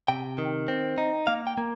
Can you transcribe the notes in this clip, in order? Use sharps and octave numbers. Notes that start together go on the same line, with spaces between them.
C3 G5
D#3
C4
D#4
A#3 F5
G5
A#3